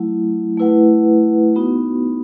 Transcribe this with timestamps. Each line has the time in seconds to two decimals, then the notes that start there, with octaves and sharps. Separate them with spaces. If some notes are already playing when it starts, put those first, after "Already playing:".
Already playing: F#3 A3 E4
0.58 A3 E4 B4 F#5
1.56 B3 D#4 F#4